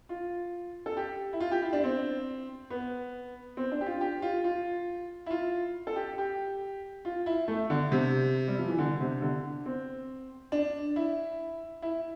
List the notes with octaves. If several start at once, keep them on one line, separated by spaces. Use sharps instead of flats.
F4
A4
G4
E4
F4
G4
E4
D4
C4
B3
C4
D4
G4
F4
G4
F4
F4
E4
F4
A4
G4
G4
F4
E4
A3
D3
C3
G3
F3
E3
D3
C3
D3
C4
D4
E4
E4